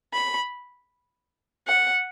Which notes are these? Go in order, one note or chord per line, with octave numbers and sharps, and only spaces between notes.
B5
F#5